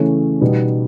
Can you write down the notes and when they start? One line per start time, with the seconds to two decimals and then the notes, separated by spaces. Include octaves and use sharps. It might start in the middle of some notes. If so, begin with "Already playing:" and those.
Already playing: C#3 E3 A3 C#4
0.41 B2 G3 B3 D#4